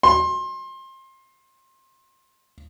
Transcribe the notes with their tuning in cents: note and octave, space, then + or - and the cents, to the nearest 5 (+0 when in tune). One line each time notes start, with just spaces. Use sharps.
C6 +25